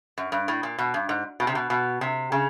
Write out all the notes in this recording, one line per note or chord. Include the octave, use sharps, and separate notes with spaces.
F#2
G2
A2
A#2
B2
G2
G#2
B2
C3
B2
B2
C3
C#3